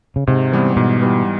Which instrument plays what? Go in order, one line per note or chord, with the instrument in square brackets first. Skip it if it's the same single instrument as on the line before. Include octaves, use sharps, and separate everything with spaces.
[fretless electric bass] C#3
[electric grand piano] G#2 [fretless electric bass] C3
[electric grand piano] E3 G3 B3
[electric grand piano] G#2 [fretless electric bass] B2
[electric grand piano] E3 G3 B3